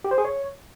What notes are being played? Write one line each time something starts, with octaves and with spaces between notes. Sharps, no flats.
G4
C5
G#4
C#5